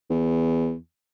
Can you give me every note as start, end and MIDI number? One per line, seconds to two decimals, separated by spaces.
0.10 0.75 40